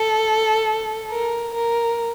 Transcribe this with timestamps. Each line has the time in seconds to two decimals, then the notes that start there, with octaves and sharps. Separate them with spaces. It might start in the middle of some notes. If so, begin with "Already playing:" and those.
Already playing: A4
1.10 A#4
1.54 A#4